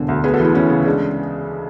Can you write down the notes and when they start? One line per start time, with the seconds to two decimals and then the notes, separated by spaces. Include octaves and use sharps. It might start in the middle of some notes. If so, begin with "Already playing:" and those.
Already playing: E1 D3
0.08 D2
0.24 B3 G#4 B4
0.34 F#4 A4
0.40 E3 E4 G#4
0.54 D2 C#4 E4
0.70 C#3
0.85 G#3 D4